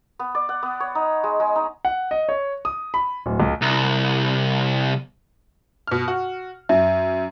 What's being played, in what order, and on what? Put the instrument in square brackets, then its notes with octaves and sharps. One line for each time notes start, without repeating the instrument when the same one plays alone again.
[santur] B3
D5
F#5
B3
C#5
D#4
G#3
G#3
D#4
[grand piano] F#5
D#5
C#5
D#6
B5
D1
C#2
[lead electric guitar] C2
[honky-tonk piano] B2 F6
F#4
[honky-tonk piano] F#2 [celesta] E5